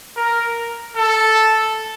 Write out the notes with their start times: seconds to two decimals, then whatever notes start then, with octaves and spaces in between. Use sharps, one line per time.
0.17 A#4
0.97 A4